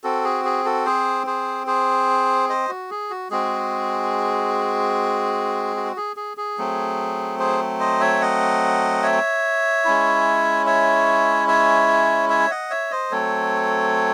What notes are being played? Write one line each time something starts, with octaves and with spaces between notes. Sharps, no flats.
C4 F#4 A4
G#4
G#4
F#4 A4
G#4 C5
G#4 C5
G#4 C5
C5 D#5
F#4
G#4
F#4
G#3 C4 F#4 G#4
F#4
G#4
G#4
G#4
F#3 A3 C4
G#4 C5
C5 D#5
C#5 E5
D#5 F#5
C#5 E5
G#3 C#4 E4
C#5 E5
C#5 E5
C#5 E5
D#5 F#5
C#5 E5
C5 D#5
F#3 A3 C4 A4 C#5